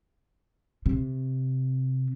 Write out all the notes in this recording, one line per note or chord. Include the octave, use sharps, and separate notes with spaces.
C3